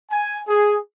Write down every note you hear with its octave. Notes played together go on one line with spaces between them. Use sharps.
G#5
G#4